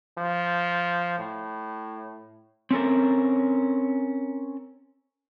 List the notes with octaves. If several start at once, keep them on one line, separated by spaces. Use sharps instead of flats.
F3
A2
C4 C#4 A4 A#4